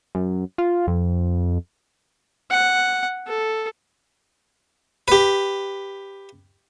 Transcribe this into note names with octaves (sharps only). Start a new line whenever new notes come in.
F#2
F4
F2
F#5
A4
G4 B4